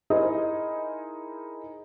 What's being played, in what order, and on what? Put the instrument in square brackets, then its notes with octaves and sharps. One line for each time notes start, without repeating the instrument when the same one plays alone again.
[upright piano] D#4 E4 G#4 A#4 C5 D#5